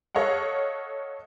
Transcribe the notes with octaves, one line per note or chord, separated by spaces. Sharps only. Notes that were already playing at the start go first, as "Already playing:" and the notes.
A4 C#5 D#5 F5 F#5